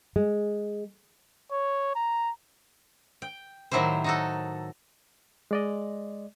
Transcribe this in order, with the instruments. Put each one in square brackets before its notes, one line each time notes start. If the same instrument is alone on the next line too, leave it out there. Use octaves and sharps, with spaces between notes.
[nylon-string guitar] G#3
[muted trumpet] C#5
A#5
[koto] G5
A2 D#3 F#3 E4 G4 C5
D#4 F#4 A4
[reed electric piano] G#3 D5 D#5